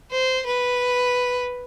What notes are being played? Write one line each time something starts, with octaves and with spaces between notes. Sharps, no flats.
C5
B4